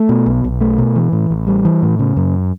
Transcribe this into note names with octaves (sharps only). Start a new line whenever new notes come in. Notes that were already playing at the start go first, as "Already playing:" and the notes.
Already playing: A3
B2
B1
B1
A3
B2
E3
A2
A1
G3
E3
A2
C#3
F#2